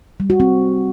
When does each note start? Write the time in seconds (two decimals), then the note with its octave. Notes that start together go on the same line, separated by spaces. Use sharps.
0.20 G3
0.30 F#4
0.40 C4